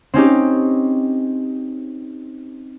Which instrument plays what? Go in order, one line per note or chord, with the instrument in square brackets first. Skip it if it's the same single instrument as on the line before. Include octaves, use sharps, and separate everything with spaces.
[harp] C4 C#4 D#4 G4